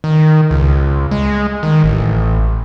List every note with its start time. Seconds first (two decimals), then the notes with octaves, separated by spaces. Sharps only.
0.04 D#3
0.51 C#2
1.11 G#3
1.63 D#3
1.84 A1